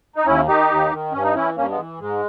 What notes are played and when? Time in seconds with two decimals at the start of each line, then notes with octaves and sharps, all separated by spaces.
0.16 D#4
0.26 D#2 C#4 E4
0.48 D#3 D#4 G4
0.70 D#2
0.91 D#3
1.12 G2 C#4
1.23 D#4
1.34 E3 C#4 E4
1.56 G2 A#3 C#4
1.71 G#3 B3
1.78 E3
1.99 G#2 G#3